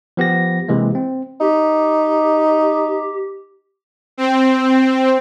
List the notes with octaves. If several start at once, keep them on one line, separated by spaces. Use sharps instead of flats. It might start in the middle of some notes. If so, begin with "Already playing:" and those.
F3 B3 G4 A#6
C3 E3 G#3 A#3
C4
D#4 G4
C4